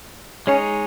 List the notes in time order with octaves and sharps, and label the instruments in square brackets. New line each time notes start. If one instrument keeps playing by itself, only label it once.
[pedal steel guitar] G#3 D#4 G#4 C#5 [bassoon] C#4